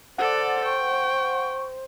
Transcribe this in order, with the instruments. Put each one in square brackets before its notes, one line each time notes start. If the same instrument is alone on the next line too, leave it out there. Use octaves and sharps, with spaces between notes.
[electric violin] A4 D5 [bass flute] C5 [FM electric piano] F#5
[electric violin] G5 [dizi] C#6